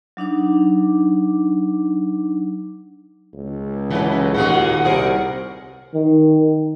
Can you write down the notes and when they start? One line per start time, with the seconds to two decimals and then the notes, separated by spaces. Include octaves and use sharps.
0.17 F#3 D4 D#4 D6
3.34 C#2
3.90 E3 F#3 C#4 E4 A4 B4
4.34 D#2 A#2 G#3 A#3 C4 F#4 F#5
4.85 C2 G4 G#4 A#4 C5
5.94 D#3